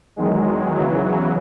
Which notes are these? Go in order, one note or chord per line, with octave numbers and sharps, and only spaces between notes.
E2 D#3 F#3 G#3
E2 C#3 E3 F#3
F#3